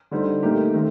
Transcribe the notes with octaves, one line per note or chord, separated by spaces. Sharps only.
D3 G3 C4 D#4
A#2 A3 D#4 G4 A#4
D#3 A3 C4